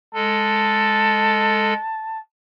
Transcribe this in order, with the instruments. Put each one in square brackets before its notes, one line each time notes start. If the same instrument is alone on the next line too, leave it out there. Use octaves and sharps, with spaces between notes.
[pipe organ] G#3 A4 [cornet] A5